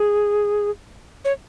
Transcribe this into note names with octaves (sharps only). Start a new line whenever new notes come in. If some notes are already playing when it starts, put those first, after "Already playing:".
Already playing: G#4
C#5